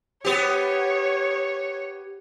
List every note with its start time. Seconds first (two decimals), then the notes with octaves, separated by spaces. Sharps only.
0.25 B3 G4 C#5